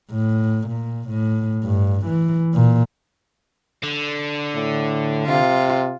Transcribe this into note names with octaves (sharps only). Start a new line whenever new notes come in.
A2
A#2
A2
G2
E3
A#2
D3
A2
C3 F4